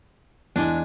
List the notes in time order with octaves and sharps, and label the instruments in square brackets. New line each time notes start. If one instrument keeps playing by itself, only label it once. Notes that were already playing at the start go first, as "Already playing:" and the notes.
[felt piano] E2 [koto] G#3 D4